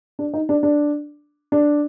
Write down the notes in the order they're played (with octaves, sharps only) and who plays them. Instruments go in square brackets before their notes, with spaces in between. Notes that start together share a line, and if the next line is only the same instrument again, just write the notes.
[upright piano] D4
D#4
D4
D4
D4